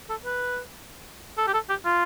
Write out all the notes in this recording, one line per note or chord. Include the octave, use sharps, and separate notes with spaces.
A4
B4
A4
G4
A4
G4
F4